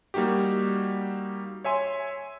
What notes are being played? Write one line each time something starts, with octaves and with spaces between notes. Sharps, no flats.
G3 A#3 D#4 F#4 G4
C#5 E5 G#5 C6